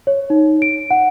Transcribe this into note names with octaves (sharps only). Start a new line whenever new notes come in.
C#5
D#4
D7
F#5